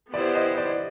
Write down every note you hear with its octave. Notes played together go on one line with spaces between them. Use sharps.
B3 E4 G4 C5 D5
D#5
D5